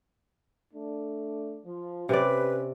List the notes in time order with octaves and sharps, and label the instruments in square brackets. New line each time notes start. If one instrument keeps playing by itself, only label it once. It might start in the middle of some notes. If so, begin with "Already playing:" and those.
[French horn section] A3 D4
F3
[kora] C3 D5 [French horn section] C#4 [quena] B4